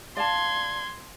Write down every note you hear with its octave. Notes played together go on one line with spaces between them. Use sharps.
D5 F5 A5 C6 G#6